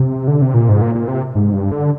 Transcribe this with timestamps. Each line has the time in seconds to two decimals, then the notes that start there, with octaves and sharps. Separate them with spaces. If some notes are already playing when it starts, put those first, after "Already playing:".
Already playing: C3
0.28 D3
0.42 C3
0.54 A#2
0.69 G#2
0.81 A#2
0.95 A#2
1.08 C3
1.35 G#2
1.53 G2
1.72 D3